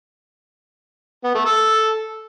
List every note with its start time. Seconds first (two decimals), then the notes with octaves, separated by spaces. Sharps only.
1.24 B3
1.35 A3
1.45 A4